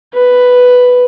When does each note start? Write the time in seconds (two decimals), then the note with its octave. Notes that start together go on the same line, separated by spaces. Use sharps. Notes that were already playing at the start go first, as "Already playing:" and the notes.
0.14 B4